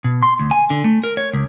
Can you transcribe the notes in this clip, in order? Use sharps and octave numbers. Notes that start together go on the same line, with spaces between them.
B2
C6
D2
G#5
D3
A3
A#4
C#5
C#2